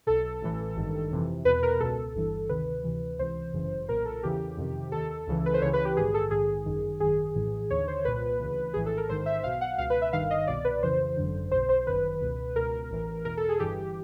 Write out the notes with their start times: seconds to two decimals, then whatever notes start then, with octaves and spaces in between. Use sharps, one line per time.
0.07 B1 B2 A4
0.41 A1 A2 E3
0.76 G#1 G2 D#3
1.11 F2 C3 E3
1.45 E2 B2 B4
1.63 A#4
1.80 C#2 B2 A4
2.15 G1 G2 E3
2.49 D2 C3 D#3 B4
2.84 D2 C3 E3
3.19 C#2 C3 E3 C5
3.53 G1 F#2 C#3 E3
3.89 B1 A#2 A#4
4.05 A4
4.23 E2 C#3 E3 G4
4.57 F2 C3 D#3
4.92 D#2 D#3 A4
5.27 C#2 C#3 E3
5.46 B4
5.54 C5
5.62 C#2 C#3 E3 C#5
5.73 B4
5.85 G4
5.97 A#1 G#2 D#3 G#4
6.14 A4
6.31 A#1 G#2 D#3 G#4
6.66 G1 F#2 D#3
7.00 G#1 F#2 D#3 G#4
7.35 A#1 A2 E3
7.70 D#2 D3 C#5
7.88 C5
8.05 C2 A#2 B4
8.40 D2 C#3 E3
8.74 A#1 A2 E3 G#4
8.86 A4
8.97 A#4
9.09 A1 G#2 D#3 C5
9.26 E5
9.43 B1 B2 F5
9.61 F#5
9.78 C#2 B2 F5
9.90 B4
10.02 E5
10.13 G1 G2 D#3 F5
10.31 D#5
10.47 C2 B2 D5
10.65 B4
10.82 F2 C#3 E3 C5
11.17 G#1 F#2 D3
11.52 B1 B2 C5
11.69 C5
11.87 G1 F#2 D#3 B4
12.22 C#2 B2
12.56 C#2 B2 A#4
12.90 A1 A2 E3
13.25 E2 B2 A#4
13.37 A4
13.49 G#4
13.60 G1 G2 E3 G4